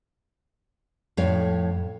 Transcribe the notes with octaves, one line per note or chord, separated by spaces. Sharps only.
F2 A2 C#5 F5